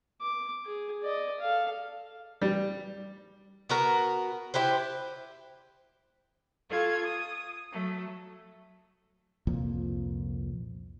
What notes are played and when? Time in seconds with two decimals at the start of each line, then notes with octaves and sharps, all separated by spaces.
0.21 D6
0.66 G#4
1.03 D5 D#5
1.40 A4 F5
2.42 G3
3.69 B3 F#4 A#4
4.54 E4 G4 B4 C5
6.69 F4 A4 C#6 G#6
7.03 D#6
7.71 F#3 A3
9.47 C2 F2 A#2 F3